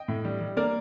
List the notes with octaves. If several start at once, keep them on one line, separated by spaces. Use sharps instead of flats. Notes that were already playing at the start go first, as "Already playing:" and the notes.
Already playing: D#5 G5
A2
G3
G3
A#3 A#4 D5